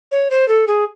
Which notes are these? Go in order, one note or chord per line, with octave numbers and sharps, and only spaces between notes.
C#5
C5
A4
G#4